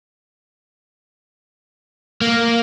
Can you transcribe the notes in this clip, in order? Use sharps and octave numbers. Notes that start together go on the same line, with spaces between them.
A#3